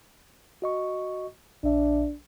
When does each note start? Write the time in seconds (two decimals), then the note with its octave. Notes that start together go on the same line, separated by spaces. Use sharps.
0.62 F#4 D#5 C#6
1.64 A#1 D4 E5